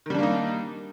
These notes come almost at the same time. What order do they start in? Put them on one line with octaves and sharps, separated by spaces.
D#3 G3 D4 A#3 D#4